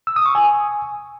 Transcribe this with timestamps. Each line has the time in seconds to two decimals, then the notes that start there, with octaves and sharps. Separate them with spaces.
0.07 E6
0.16 D#6
0.26 C#6
0.35 G#5